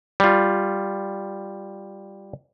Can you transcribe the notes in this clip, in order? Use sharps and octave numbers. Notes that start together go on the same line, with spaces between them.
G3 F4